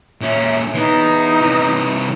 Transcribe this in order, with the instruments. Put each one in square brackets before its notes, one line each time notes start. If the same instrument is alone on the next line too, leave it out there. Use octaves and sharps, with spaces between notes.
[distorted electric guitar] A#2 C#4 [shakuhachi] E5
[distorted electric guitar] E3 B3 [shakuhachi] D#4
[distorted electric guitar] C3 E3